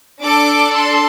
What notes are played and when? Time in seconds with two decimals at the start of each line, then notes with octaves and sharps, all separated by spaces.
0.22 D4 A4 D6
0.75 C6